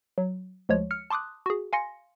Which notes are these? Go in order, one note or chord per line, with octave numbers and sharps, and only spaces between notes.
F#3
D2 F3 G#3 C#5
F6 C#7
A5 C6 D6 D#6 F#6
F#4 G#4
F5 G#5 C6 A#6 C#7